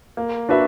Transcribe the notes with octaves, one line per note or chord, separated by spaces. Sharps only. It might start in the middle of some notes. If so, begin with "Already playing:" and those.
A#3
D4 F#4 B4 E5